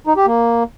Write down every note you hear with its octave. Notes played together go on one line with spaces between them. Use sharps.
D#4
G4
A#3